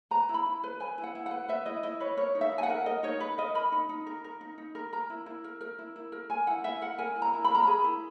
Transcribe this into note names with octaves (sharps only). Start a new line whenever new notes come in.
B4 A#5
E4
B5
E4
B4
B4 G#5
E4
F#5
E4
F#5
B4
B4 E5
E4 D#5
E4 D#5
B4 C#5
A#4 C#5
D#4
E5
D#4
G#5
F#5
A#4
A#4 D#5
D#4 C#5
D#4 B4
A#4 D#5
A#4 B5
D#4
D#4
A#4
A#4
D#4
D#4
A#4
A#4 A#5
E4
E4
A#4
A#4
E4
E4
A#4
A#4 G#5
E4 F#5
E4 E5
A#4 F#5
A#4 G#5
E4
A#5
E4
B5
A#4 A#5
G#4 B5
E4